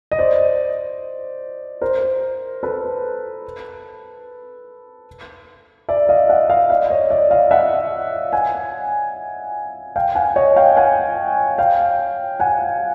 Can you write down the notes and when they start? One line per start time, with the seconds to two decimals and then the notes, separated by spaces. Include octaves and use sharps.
0.11 D#5
0.19 C5 D5
1.81 A#4 C5
2.63 A4 B4
5.89 D5 E5
6.09 D#5 F5
6.29 E5 F#5
6.50 D#5 F5
6.70 D5 E5
6.90 C#5 D#5
7.10 D5 E5
7.31 D#5 F5
7.51 E5 F#5
8.32 F#5 G#5
9.96 F5 G5
10.15 F#5 G#5
10.36 C#5 D#5
10.56 F5 G5
10.77 F#5 G#5
11.58 F5 G5
12.40 F#5 G#5